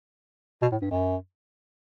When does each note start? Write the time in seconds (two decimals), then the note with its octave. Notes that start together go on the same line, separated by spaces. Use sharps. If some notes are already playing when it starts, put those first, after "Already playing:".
0.62 B2
0.72 A2
0.82 G2
0.91 F#2